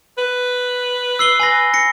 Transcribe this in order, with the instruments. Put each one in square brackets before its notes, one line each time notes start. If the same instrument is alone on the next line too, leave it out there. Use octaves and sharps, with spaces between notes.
[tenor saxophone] B4
[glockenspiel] E6 C7 G7
G#5 B5 A#6
A#6 C#7